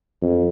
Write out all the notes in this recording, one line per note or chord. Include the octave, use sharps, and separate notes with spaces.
F2